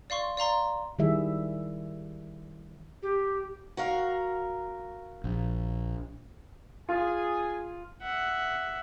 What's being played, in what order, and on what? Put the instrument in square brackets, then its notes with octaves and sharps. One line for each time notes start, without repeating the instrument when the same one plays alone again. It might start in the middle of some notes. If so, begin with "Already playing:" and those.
[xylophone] D5 F5 C6 C#6
D5 F5 A#5 C6
[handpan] D#3 G3 E4 G#4 E5
[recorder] G4
[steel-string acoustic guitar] F#4 A#4 F5
[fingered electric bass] A#1
[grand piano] F4 [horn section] G#4 G#5
[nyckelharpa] E5 F#5